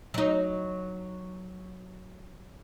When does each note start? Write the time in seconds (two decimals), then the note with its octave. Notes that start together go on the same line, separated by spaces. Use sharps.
0.14 F#3 D#4